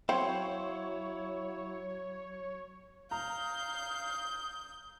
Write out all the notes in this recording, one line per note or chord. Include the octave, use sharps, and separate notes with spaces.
F#3 C4 E4 C#5 F5 F#5
F5 A#5 D#6 G6